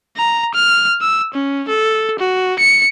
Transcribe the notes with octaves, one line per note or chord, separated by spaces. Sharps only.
A#5
F6
E6
C#4
A4
F#4
C#7